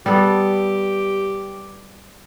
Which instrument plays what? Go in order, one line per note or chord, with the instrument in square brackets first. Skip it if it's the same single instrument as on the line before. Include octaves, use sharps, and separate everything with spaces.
[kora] G3 B3 A4 [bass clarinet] G4